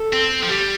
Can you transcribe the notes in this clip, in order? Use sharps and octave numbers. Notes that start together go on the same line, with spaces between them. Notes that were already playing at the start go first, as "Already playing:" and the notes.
Already playing: A4
C4
F3
G3 G4